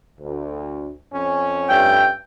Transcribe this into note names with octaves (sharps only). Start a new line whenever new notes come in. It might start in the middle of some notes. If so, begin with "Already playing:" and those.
D2
F2 C#4
G2 A3 G5